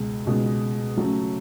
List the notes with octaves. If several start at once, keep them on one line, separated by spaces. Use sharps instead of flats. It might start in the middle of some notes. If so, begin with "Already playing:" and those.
Already playing: C#2 B2 G#3
C#2 B2 G#3
C#3 F#3 A3 C#4